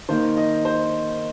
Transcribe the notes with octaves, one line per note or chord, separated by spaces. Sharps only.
D#3 A#3 D#4 C5
D#5
C5